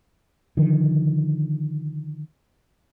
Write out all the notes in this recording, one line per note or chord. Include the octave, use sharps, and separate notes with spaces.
D3 D#3 F3